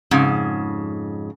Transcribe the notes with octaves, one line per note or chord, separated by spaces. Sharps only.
F2 G#2 C#3